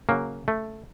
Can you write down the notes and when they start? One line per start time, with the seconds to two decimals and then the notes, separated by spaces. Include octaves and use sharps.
0.09 C#3 F#3 A#3
0.48 A3